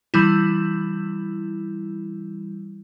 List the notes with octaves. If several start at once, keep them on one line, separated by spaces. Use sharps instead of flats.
E3 G3 E4